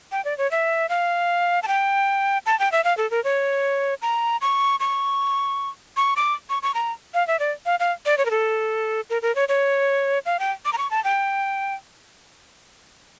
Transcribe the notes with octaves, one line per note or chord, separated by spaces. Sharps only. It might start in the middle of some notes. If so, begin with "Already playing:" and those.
G5
D5
C#5
E5
F5
A5
G5
A5
G5
E5
F5
A4
A#4
C#5
A#5
C#6
C#6
C#6
D6
C#6
C#6
A#5
F5
E5
D5
F5
F5
D5
C#5
A#4
A4
A#4
A#4
C#5
C#5
F5
G5
D6
A#5
C#6
A5
G5